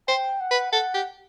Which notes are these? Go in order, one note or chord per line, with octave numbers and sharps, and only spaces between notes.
C5 G5
F#5
B4
A4 F#5
G4